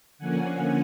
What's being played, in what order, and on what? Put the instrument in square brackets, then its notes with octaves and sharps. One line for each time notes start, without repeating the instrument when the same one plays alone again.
[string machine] D3 F3 A#3 C#4 F#5 G#5